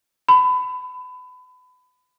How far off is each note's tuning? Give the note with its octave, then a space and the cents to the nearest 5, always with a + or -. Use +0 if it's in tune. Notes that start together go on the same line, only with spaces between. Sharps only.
B5 +25